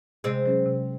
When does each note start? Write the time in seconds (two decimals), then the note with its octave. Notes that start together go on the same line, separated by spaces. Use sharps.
0.24 C3 G#3 C4
0.46 F#3 C#4 G#4
0.66 C3